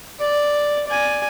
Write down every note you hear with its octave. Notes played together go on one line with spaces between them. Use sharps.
D5
D5 G#5